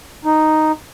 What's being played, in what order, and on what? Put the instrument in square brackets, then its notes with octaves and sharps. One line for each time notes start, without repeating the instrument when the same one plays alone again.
[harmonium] D#4